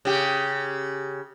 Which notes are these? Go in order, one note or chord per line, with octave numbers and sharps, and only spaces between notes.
C#3 G4